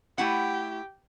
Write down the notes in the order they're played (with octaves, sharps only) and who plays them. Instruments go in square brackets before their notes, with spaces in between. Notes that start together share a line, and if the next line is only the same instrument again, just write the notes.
[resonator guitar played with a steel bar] A3 E4 F#5 [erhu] G4